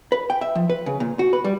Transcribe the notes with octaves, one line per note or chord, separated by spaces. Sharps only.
B4
G5
E5
F3
B4
C#3
A#2
F#4
B4
G3